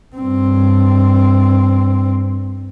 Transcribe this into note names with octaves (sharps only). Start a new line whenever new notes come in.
G2 C4